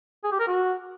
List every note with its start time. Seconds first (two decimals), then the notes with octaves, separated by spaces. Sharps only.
0.24 G#4
0.32 G4
0.40 A#4
0.47 F#4